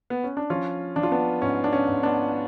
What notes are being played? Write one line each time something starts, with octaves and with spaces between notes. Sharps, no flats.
B3
C#4
D4
F3 C#4 F4
F3 D4
F4
B3 D4
G#2 C#4
D4
C#4
G#2
B3 D4